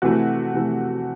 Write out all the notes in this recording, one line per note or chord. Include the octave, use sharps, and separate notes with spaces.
C3 E3 A3 F#4
C3 E3 A3